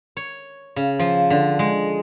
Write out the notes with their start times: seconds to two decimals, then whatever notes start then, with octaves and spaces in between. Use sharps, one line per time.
0.17 C#5
0.76 C#3
0.99 F3
1.30 D3
1.59 G#3